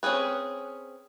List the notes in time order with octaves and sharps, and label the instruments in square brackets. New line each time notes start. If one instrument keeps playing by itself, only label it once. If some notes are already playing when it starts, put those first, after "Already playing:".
[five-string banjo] C4 C#4 F#4 G#4 B4